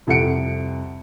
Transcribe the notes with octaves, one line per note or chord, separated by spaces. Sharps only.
C2 F2 A4 F#5 C#7 D7